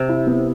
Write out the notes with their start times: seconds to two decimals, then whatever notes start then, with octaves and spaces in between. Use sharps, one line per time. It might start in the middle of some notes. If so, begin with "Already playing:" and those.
Already playing: C3
0.09 E4
0.27 B3